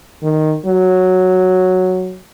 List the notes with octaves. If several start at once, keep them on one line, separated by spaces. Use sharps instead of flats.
D#3
F#3